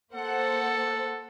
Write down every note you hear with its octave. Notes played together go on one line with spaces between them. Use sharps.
A#3 A4 C5 F#5